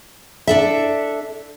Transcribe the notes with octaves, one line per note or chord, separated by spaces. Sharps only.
D4 A4 E5